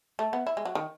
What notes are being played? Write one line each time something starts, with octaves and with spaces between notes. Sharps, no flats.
A3
B3
E4
G#3
F#3
D#3